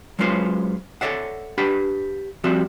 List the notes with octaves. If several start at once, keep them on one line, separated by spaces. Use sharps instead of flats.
F#3 G#3 C#4 F4 B4 C5
A4 A#4 C#5 D5 E5 F#5
D4 G4 B4 F#5 B5
F3 G3 C4 F#4 E5